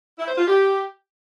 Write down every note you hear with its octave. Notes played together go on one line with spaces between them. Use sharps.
E4
C5
F4
G4